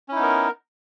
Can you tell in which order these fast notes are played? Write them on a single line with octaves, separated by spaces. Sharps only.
C#4 E4 D#4 B3 A#4